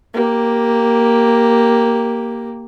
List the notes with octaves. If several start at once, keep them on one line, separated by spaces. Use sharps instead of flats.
A#3 G4